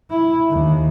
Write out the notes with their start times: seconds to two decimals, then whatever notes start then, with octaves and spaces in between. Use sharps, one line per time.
0.10 E4
0.50 D#2